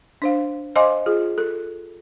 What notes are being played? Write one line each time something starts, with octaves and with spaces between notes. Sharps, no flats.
D4 C5 F5
C5 D#5 F5 G#5 C6 D6
F4 G#4
A4